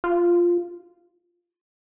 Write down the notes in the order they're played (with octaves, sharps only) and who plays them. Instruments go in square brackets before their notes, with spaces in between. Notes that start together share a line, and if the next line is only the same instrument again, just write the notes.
[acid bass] F4